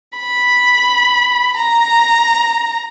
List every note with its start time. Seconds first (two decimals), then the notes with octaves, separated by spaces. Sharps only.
0.17 B5
1.58 A#5